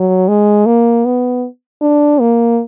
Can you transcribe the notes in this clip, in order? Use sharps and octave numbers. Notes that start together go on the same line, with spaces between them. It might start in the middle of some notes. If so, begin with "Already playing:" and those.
Already playing: F#3
G#3
A#3
B3
D4
A#3